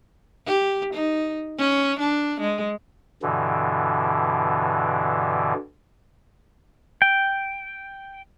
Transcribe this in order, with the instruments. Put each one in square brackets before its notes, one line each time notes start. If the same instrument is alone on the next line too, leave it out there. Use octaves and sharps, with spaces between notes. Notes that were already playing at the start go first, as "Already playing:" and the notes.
[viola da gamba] G4
D#4
C#4
D4
G#3
[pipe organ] G2 B2 D3 E3
[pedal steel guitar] G5